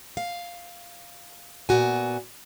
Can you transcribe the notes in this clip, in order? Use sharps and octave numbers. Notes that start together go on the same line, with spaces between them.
F5
A#2 B3 F#4 G#5